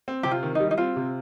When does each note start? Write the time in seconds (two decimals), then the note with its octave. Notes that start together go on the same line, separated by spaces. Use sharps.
0.08 C4
0.23 C3 G4
0.31 F4
0.43 D#3
0.55 G3 D#4
0.71 D#4
0.78 C4 F4
0.96 C3